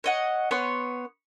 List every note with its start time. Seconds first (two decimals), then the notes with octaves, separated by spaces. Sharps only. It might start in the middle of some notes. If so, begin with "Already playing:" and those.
0.04 C#5 D#5 F#5
0.51 B3 C#5 C6